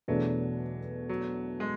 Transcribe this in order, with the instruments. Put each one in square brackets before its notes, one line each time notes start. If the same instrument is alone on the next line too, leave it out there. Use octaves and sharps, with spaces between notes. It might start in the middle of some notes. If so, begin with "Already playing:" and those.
[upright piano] E2 B2 A3 D4 F#4 [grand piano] F#3
[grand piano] F#3
G#3